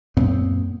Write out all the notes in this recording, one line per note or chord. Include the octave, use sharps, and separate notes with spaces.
F#2 A#2 B3 C4